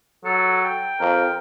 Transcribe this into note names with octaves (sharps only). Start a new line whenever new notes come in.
F#3 A4
G5
F2 A#4